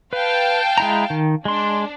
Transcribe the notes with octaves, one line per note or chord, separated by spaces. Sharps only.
B4 F5 G5 A5
G#3 E4 A#5
D#3
G#3 D4 C6